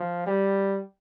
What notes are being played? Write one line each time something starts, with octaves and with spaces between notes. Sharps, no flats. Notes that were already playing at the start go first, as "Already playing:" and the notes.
Already playing: F3
G3